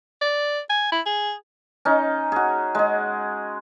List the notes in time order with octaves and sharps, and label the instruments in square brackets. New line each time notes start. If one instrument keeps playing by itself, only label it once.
[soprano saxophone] D5
G#5
E4
G#4
[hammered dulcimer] C#4 D#4
F#4 G#4
G#3 G#4